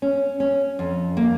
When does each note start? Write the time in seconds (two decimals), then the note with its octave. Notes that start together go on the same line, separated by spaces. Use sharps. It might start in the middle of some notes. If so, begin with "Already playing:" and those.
0.02 C#4
0.40 C#4
0.79 F2
1.17 A#3